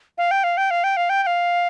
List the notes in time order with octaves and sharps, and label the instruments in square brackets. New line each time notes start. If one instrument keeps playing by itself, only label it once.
[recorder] F5
G5
F5
G5
F5
G5
F5
G5
G5
F5